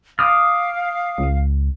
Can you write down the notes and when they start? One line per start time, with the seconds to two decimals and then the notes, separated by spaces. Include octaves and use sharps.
0.19 F5 D6 D#6 F6
1.18 C#2